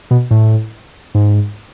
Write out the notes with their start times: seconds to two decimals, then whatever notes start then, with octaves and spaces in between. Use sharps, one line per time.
0.11 B2
0.31 A2
1.15 G#2